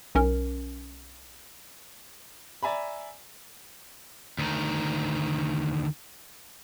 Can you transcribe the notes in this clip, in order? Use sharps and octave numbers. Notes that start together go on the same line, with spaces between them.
B1 C#4 A#4
D5 E5 G#5 A#5 B5
D2 D#3